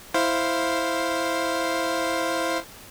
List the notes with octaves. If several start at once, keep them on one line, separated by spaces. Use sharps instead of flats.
E4 C5 F5